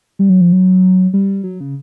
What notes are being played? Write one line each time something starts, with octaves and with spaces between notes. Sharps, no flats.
G3
F#3
F3
F#3
G3
F#3
C#3